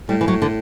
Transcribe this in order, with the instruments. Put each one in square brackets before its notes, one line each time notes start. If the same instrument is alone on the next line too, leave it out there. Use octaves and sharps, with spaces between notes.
[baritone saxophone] A2 [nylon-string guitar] G3
[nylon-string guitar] E3
F#3
D3